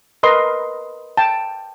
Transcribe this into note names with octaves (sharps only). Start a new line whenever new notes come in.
A#4 B4 D#5 C6
G5 A5